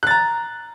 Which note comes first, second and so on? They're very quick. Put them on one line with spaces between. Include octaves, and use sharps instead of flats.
F#6 A6 A#5